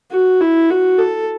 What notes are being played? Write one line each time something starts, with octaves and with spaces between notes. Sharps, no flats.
F#4
E4
F#4
A4